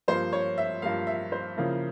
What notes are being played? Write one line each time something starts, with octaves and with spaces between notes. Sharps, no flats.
G2 F3 A#3 C5
C#5
E5
G2 F3 A#3 F5
E5
C5
C#3 F3 A#3 E4